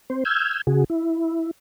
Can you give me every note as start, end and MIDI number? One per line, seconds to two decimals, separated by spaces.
0.10 0.24 60
0.10 0.24 72
0.25 0.61 88
0.25 0.61 89
0.25 0.61 91
0.25 0.61 92
0.67 0.84 49
0.67 0.84 66
0.67 0.84 68
0.90 1.51 64